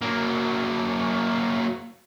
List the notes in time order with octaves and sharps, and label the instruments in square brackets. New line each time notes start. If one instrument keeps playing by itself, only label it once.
[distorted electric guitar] F#3 A#3